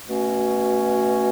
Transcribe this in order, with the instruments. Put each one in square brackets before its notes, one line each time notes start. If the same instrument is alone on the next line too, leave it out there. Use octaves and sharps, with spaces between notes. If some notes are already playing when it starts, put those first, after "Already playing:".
[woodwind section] B2 A3 C#4 F#4